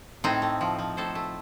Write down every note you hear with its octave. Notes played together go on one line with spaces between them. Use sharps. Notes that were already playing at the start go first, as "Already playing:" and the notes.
A2 C4 D#4
A3
F3
F3
A2 A4 C5
A3